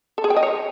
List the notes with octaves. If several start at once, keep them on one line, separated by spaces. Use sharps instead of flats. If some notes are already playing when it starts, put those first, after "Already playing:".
A4
G#4
G5
D#5
C#5